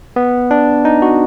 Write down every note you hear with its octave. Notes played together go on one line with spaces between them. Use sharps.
B3
D4
D#4
F#4